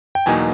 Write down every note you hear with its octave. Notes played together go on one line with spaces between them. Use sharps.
G5
E2 B2 F#3 A#3 D#4 G#5